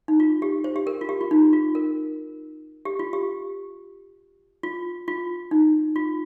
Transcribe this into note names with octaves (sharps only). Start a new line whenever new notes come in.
D#4
F4
G4
C5
G4
A#4
F4
G4
F4
D#4
F4
A#4
G4
F4
G4
F4
F4
D#4
F4